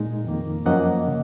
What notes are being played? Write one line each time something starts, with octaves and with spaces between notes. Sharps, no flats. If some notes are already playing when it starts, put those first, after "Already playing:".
Already playing: A#2 G#3 D#4
F2 D#3 A#3
F#2 F3 A#3 C#4 D#5 F#5
C#3